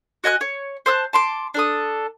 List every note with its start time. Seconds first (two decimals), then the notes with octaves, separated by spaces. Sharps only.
0.24 F#4 D#5 G#5 F#6
0.41 C#5
0.86 C5 A5 E6 F#6
1.13 A5 C6 D6
1.54 D4 A4 D#6